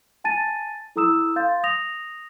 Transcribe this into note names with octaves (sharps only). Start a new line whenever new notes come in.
G#5 A5 A6 D#7
E4 A4 A#5 D#6 E6 E7
F5 C6 G6 A6
D#6 A#6 F7